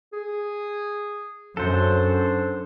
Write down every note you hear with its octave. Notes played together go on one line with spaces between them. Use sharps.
G#4
F#2 D4 A4 C5